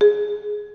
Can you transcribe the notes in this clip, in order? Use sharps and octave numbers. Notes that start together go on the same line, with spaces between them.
G#4